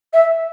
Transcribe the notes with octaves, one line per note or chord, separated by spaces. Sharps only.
E5